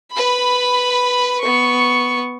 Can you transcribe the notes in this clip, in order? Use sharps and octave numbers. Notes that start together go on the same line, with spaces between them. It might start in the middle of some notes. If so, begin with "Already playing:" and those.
B4 B5
B3 C#6